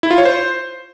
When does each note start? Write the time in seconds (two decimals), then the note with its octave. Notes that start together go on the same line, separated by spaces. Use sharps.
0.03 E4
0.11 F4
0.18 C#5
0.25 C5